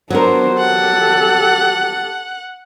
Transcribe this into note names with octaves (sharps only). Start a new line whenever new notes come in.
F#3 B3 D4 A#4 C5
G4 A4 F#5